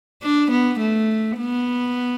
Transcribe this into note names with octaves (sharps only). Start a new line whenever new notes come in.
D4
B3
A3
B3